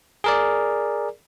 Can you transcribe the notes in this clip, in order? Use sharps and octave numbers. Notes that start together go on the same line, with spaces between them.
G#4 A#4 D5